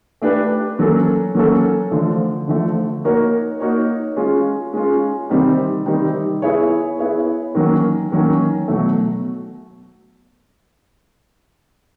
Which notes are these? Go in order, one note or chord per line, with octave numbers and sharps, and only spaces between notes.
A3 D4 G4 B4
F#3 A#3 C#4 F#4 A4
F#3 A#3 C#4 F#4 A4
D3 F3 A3
D3 F3 A3
A#3 D#4 F#4 A#4 C#5
A#3 D#4 F#4 A#4 C#5
G#3 C#4 F4
G#3 C#4 F4
C3 D#3 G3 C4 D#4
C3 D#3 G3 C4 D#4
B3 E4 G#4 C#5
B3 E4 G#4 C#5
D#3 F#3 A#3 C#4
D#3 F#3 A#3 C#4
B2 F#3 A3